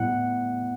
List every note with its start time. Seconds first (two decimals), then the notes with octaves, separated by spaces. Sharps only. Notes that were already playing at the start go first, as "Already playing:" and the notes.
Already playing: A2 G3 B3 E4 F#5